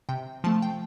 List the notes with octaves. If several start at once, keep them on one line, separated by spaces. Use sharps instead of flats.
C3 G5
F3 A3 A5
G5